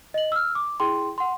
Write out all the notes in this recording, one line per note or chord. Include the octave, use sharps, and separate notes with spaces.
D#5 F#7
E6 F6
D6
E4 G#4 G5 C6
F#5 C6